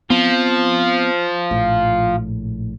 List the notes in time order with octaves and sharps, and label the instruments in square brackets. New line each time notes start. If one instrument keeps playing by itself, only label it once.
[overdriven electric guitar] F3 [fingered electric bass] B3 C4
[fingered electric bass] A#1 A2